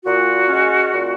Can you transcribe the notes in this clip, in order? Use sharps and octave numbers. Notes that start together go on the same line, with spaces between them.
A#2 F#4
G#3 C#4
A#2